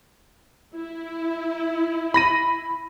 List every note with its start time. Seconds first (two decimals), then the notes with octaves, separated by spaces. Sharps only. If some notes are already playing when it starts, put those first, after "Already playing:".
0.74 E4
2.14 B5 A#6 D#7